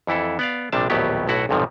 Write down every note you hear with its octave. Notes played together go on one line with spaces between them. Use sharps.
F2 E3 E4 A4
B3 D5 F5
A#1 C3 G3 D4 A5
A#1 D#2 A2 F#3 B3 G4
B1 A2 E4 F#4 F#5
B1 F2 G#2 C3 D#3 F3